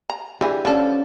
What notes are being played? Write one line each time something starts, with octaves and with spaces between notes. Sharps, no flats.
A#5
D3 E3 G4 G#4
D3 F3 C#4 A4 D5